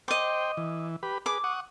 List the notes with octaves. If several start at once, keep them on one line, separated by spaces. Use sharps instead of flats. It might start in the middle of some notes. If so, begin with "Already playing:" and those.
C5 D#5 G5 D6
E3
G4 B4 B5
G#4 B4 D6
F#5 C#6 D#6